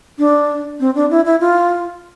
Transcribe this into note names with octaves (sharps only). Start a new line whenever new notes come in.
D4
C4
D4
E4
E4
F4